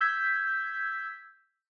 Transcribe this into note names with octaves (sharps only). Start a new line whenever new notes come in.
E6 G6 G#6 B6